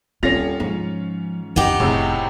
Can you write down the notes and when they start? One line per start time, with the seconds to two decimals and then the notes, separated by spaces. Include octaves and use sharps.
0.23 D#1 C4 C#4 F4 A#6 F7
0.60 G#2 F3
1.56 F2 D3 B3 D#4 G4
1.80 F1 A2 C3 G#4